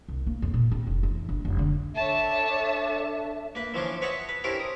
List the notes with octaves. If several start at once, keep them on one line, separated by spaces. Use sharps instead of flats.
C2
A#3
F2
A#2
C4
F1
E3
G1
F1
D3
D4 A4 C#5 E5 A5
A#3 B4
E3 F3 C#4 D4
B4 C#5 D#5 E5 F#5 A5
B4
C#4 D4 E4 G4 A#4 C5
D#6